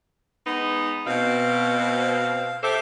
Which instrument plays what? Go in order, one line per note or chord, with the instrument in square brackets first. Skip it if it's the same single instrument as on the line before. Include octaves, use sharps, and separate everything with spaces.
[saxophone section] G#3 B3 D#4
[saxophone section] B2 C4 [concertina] F5
[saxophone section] G4 C5 E5 [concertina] A4 D6